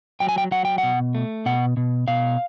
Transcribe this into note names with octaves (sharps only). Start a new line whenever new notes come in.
F#3 G5
G#5
G5
F#3 F#5
G5
F#5
B2
A3
B2 F#5
B2
B2 F5